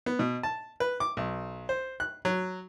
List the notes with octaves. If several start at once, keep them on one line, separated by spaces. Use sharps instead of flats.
B3
B2
A5
B4
D6
B1
C5
F#6
F#3